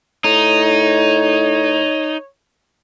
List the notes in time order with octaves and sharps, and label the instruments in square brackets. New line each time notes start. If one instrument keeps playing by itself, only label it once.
[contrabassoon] A2 [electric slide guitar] D#4 [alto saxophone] C#5